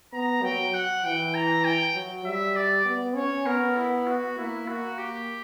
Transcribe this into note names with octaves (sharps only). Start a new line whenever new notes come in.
B3 A#5
F#3 G5
F#5
E3 G5
A#5
G5
F#3
G3 E5
D5
B3
C#4 C#5
B3 A#4
E4
F#4
A#3 E4
A#3 F#4
G4